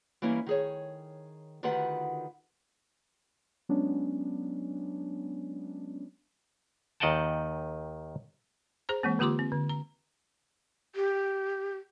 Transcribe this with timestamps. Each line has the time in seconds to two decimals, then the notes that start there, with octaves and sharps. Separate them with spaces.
0.22 E3 G3 A#3 C#4 E4
0.46 D#3 G#4 C#5
1.63 D2 D#3 F4 G4 B4 F#5
3.69 F#3 G#3 B3 C#4 D4
7.00 D#2 D#3 D#5 F#5 G5 A5
8.89 G#4 C5 A#5
9.03 E3 G#3 A#3 C4
9.19 D3 A#3 F4 G4 C6 D6
9.39 C4
9.52 D3
9.69 A#5
10.95 G4